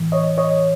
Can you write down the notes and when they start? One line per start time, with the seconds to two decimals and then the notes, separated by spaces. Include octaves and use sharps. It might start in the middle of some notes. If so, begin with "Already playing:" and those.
Already playing: A2 E3
0.12 C#5 D#5
0.38 C#5 D#5